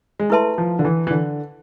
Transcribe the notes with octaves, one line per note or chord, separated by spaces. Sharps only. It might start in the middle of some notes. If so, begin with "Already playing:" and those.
G#3
A3 E4 B4 E5 A5 C6
F3
D3
E3
E3
D3